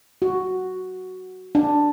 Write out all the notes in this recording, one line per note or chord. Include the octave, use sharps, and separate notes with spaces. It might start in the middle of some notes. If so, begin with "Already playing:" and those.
F#4
D4